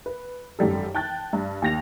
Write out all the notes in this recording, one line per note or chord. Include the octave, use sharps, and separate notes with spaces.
B4
G#1 F#2 G3 A4
G5 A5 F#6 A6
G2
D#2 G4 A#6 F7